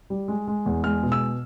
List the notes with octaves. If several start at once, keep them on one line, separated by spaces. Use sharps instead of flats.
G3
G#3
G#3
E2
G#3 F6
B2
E6